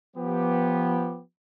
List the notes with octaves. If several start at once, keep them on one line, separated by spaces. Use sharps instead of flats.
F3 B3 G4